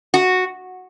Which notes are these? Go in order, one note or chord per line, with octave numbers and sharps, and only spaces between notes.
F#4